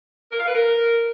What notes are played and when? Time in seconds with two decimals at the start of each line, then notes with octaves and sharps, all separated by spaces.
0.31 A#4
0.38 F5
0.46 B4
0.54 A#4